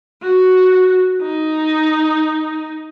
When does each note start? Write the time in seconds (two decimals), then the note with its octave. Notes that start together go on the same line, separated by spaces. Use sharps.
0.22 F#4
1.22 D#4